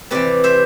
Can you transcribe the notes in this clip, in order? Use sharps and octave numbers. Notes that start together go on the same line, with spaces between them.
C3 E3 B4 D5
C5 E5